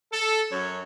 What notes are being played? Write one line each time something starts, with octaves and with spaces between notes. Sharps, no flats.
A4
F#2 C#5